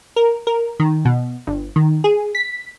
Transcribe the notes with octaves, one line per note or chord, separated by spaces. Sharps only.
A#4
A#4
D#3
B2
G1
D#3
G#4
B6